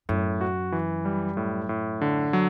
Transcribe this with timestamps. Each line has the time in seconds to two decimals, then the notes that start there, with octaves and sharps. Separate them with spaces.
0.09 F#2 A2
0.41 F#4
0.72 E3
1.05 G3
1.37 A2
1.69 A2
2.01 D3
2.33 F#3